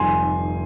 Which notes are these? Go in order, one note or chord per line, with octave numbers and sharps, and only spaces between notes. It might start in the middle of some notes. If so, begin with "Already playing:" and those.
Already playing: F1 F2 D#3 G3 G#5 C6